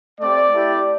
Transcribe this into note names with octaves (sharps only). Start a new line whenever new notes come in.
A3 C4 G4 D5
A3 E4 G4